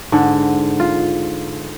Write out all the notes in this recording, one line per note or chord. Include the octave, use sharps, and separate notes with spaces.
G#2 D3
F4